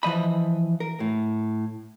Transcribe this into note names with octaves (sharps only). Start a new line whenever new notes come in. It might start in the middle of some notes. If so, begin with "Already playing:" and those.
E3 F3 D#5 B5
A#4
A2